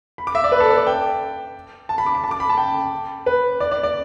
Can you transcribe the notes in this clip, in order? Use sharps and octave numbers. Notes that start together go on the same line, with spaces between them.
B5
D6
E5
D5
B4
A4
B4
D5
G5
A5
B5
D6
B5
A5
D6
B5
A5
G5
B4
D5
D5
D5